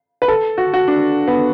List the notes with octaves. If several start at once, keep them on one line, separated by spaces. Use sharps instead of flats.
B4
A4
F#4
F#4
D4
B3